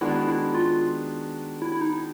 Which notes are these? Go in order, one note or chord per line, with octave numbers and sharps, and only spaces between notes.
D#3 G#3 B3 D4 E4 F#4
E4
F4
E4
E4
D#4